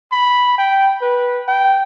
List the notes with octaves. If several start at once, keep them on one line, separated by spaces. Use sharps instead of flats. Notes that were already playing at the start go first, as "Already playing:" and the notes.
B5
G5
B4
G5